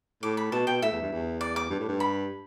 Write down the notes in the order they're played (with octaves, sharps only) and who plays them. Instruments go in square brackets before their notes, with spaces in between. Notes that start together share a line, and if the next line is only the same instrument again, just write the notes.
[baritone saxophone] A2 [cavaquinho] D6
[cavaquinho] B5
[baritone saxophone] B2 [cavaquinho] A5
[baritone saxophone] B2 [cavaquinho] G5
[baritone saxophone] A2 [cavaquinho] E5
[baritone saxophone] E2
G2
E2
[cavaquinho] D5
D6
[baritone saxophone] G2
A2
G2
[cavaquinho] B5